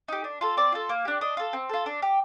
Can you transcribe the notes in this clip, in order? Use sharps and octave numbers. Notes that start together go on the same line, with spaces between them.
D#4 G4
D4
F4 A4
C4 D5
F4 A4
A#3
D4 G4
D4 D#5
F4 A4
C4
F4 A4
D4
G4